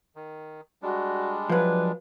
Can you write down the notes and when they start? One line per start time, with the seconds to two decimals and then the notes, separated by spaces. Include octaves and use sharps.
0.16 D#3
0.82 G3 G#3 D4 F#4
1.49 F3 F#3 B4